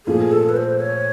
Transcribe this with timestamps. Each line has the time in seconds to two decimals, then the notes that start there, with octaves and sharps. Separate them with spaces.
0.06 A#2 F3 A3 G#4
0.32 A4
0.49 B4
0.57 C5
0.80 C#5